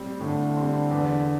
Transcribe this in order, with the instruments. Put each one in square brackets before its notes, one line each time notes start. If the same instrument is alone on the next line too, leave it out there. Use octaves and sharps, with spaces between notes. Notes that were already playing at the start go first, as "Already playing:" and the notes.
Already playing: [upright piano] A2 G3 C4
[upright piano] A2 [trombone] D3
[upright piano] G3 C4
E2